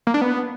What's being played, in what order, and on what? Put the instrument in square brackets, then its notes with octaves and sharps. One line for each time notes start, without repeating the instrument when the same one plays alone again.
[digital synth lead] A#3
D4
B3